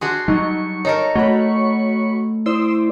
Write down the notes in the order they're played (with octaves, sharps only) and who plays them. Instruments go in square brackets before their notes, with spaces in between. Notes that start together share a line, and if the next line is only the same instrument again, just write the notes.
[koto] D4 F#4 G#4 [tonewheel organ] C6
[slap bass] F#3 G3 [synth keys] D#4 [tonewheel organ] C#6
[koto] D#4 A4 A#4 [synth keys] C#5
[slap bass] A3 [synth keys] F#4 C#5 B5
[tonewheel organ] E4 C5 D5 [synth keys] C6 D#6 E6